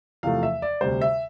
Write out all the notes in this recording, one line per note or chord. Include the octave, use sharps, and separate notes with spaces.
E2 C3 F3 A3 F5
E5
D5
D2 C3 G3 C5
E5